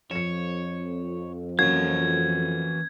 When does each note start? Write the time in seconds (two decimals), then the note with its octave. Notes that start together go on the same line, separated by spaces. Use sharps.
0.11 F2 C#5 C#7 E7
1.59 E3 F#3 A#3 C#4 F5 G#6